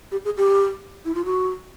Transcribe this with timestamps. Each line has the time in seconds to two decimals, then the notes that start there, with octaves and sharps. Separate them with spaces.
0.11 G4
0.25 G#4
0.37 G4
1.05 E4
1.14 F4
1.25 F#4